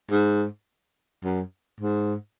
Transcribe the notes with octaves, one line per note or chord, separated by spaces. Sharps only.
G#2
F#2
G#2